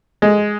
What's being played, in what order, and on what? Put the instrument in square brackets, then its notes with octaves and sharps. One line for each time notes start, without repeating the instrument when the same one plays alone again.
[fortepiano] G#3